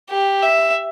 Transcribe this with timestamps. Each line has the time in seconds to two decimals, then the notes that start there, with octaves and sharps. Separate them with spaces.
0.10 G4
0.43 E5